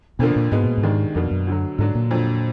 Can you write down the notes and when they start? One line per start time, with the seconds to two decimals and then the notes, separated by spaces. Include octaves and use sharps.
0.19 F2 B2 D3 F3 A#3 D4
0.36 A#2
0.51 G#2 B2 G#3 B3
0.64 A#2
0.77 G#2
0.83 D#2 D#3 G#3 D4
1.14 F2 B2 A#3 D4
1.31 F#2
1.47 D2 D3 F#3
1.78 G#2 D3 F#3 D4
1.95 A#2
2.11 F2 D3 F#3